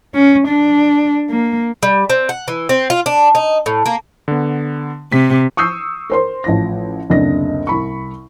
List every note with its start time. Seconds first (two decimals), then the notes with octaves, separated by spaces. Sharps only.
0.15 C#4
0.48 D4
1.30 A#3
1.83 G3
2.10 C4
2.29 F#5
2.48 E3
2.69 C4
2.90 F4
3.06 D4
3.35 D#4
3.66 A2
3.86 A#3
4.28 D3 B3
5.12 C3 B6
5.57 C#6 D#6 E6 G6 C7
6.10 A#4 C5 C6
6.44 A1 F3 A#6
7.10 F#1 D2 C3 D4 D#5 A#6
7.67 C2 B5 C#6